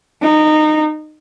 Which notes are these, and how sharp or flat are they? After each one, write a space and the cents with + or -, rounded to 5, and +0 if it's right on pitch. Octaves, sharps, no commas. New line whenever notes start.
D#4 -20